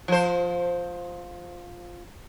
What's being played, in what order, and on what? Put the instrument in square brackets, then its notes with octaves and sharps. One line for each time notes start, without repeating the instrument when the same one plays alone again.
[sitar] F3 C5